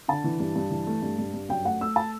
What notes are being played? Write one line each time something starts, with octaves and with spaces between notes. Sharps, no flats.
D3 A5
E3
G2
G2
E3
A3
G2
G2
G2
F#2 G5
A3 F#5
A3 E6
A5